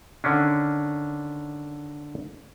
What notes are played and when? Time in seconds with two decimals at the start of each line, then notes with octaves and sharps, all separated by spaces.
0.24 D3 D#3 C#4 D4